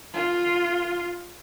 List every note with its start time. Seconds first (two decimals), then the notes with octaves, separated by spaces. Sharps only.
0.14 F4